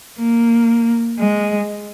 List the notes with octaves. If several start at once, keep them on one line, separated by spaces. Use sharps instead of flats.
A#3
G#3